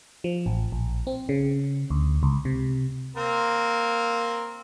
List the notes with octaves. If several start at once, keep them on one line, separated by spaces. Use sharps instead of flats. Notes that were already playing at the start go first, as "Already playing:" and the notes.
F3
A1
A#1
C4
C#3
D2
C#2
C3
A#3 C4 A#4